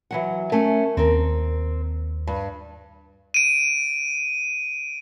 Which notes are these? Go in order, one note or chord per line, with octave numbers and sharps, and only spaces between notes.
E3 F#3 F#5
A3 C#4 A#4
D#2 C4 A#4
G2
D7 D#7